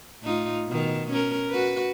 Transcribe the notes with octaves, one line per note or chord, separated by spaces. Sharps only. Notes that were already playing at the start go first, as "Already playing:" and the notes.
A2 D#4 F4
B2 D#3
C#4 A#4
F#4 B4